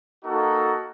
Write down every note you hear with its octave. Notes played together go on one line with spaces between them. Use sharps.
A#3 D#4 F#4 A4